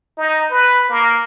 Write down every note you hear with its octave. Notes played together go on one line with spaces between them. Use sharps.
D#4
B4
A#3